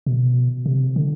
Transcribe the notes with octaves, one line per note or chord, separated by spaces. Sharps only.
B2
C3
D3